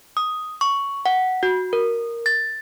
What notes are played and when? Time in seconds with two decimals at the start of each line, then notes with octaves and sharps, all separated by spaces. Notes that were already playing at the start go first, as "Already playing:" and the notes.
0.17 D#6
0.61 C#6
1.06 F#5
1.43 F#4
1.73 A#4
2.26 A6